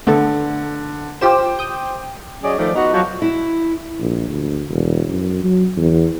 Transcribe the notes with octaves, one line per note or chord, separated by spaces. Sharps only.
D3 A3 B3 A4
F4 G4 C5 G5 D6 E7
D#6 G6
F#3 C#4 G#4 D5 D#5
D#3 F3 A3 D5
B3 D#4 F#4
F3 F#3 F#4
E4
A#1
D2
E1
F#2
F#3
E2